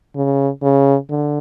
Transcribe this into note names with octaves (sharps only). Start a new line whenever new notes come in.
C#3
C#3
D3